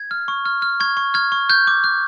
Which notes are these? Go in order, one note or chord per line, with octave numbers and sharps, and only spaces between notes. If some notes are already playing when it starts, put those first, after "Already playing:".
Already playing: G#6
F6
C#6
F6
F6
C#6 G#6
C#6
F6 G#6
C#6
F#6 G6
D6
F#6